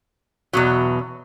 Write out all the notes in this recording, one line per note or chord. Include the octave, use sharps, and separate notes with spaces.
E2 B2 F#3